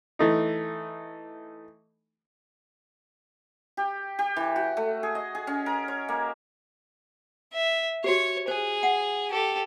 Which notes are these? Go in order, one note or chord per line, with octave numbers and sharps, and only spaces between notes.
E3 A3 D#4
G4
G4
E3
F#4
A3
G#4
D#5
G#4
C#4
A#4
C#5
A#3
E5
F#4 G4 C#5
G#4 C5
F#5
G4 A4